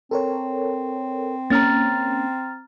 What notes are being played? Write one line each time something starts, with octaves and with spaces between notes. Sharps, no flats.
C4 A4 A#4 C#5
A#3 C#4 A#5 F6 A6